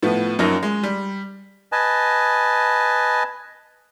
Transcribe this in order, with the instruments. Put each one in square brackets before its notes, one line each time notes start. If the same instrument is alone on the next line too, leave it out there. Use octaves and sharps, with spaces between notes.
[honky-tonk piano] A2 F3 B3
F#2 F3 F#3 A#3 C#4 D#4
G#3
G3
[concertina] B4 D#5 G#5 A5